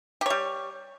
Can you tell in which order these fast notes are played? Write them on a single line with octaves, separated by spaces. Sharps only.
G4 C#5 G3